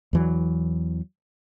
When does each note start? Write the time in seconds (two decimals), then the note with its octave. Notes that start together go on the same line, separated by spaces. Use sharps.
0.13 E2 E3 F#3